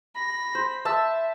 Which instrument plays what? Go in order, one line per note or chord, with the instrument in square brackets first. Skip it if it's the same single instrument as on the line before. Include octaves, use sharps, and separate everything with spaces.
[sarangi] B5 [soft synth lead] A#6
[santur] C5
[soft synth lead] E5 [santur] A5 E6